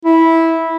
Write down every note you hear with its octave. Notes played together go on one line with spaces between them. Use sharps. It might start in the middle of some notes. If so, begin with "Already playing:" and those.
E4